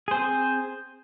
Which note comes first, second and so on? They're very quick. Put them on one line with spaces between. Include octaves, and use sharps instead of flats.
G#4 C5 C4